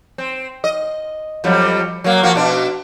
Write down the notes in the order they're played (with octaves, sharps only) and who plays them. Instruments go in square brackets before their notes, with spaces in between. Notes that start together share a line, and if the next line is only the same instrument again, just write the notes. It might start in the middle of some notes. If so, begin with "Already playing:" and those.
[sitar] C4
D#5
F2 F#3 G3
F#3 A#3
F3 A#3 F#4
B2 D4